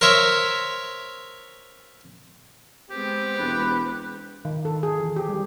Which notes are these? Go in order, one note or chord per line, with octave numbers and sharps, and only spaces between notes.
A#4 C5 C#5 E5
G#3 B3 C4 G4
E1 B5 F#6
D#3
A4
G#4
E3
G4
G3